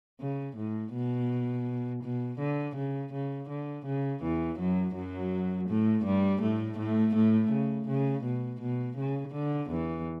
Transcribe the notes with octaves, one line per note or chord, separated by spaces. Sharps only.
C#3
A2
B2
B2
D3
C#3
C#3
D3
C#3
E2 E3
F#2 F#3
F#2 F#3
A2 A3
G2 G3
A2 A3
A2 A3
A2 A3
C#3
C#3
B2
B2
C#3
D3
E2 E3